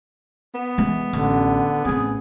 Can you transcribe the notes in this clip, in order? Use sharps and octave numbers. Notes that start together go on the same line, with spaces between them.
B3
E3 G#3
A1 D3
A1 C4 G#4